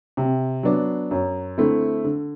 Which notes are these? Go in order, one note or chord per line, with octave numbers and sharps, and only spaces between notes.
C3
F#3 B3 D4
F#2
D3 A3 C4 E4
D3